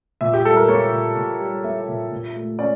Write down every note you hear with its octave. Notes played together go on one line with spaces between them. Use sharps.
A#2 E5
G4
G3 A4
A#4
A#3 C#5
A#2
A#2
G3
A#3 E5
A#2
A#2
A3
C#4 D5